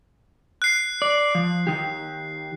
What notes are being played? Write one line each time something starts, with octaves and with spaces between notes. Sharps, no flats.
F#6 C7
D5
F3
D#3 G4